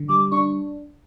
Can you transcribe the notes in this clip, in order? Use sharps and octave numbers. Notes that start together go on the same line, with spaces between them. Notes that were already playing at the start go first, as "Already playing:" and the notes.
Already playing: D3
G3 D6
D4 C#6